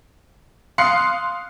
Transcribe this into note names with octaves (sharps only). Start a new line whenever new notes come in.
F5 C6 D#6 F#6 C7 C#7